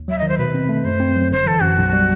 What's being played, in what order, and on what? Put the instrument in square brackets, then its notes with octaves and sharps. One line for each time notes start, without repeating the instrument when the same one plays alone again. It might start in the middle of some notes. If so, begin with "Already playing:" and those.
Already playing: [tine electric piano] D#2
[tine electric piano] F#3 [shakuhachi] E5
[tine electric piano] D#3 [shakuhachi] D#5
[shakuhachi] C5
[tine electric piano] B2 [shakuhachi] B4
[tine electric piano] C4
A3
[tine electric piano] F#2 [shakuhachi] C5
[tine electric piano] C4
F#3
[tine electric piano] G1 [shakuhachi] C5
[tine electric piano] E3 [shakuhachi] A4
[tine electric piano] F#2 [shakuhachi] F#4
[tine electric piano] B1
G3